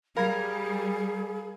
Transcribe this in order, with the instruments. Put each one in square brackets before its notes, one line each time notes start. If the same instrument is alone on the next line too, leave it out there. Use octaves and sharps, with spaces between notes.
[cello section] G3 [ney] G#4 [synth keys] A#4 [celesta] F5 B5 G#6